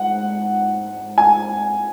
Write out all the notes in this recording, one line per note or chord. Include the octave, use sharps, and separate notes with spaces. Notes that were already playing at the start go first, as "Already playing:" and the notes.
Already playing: G#2 F#5
G#5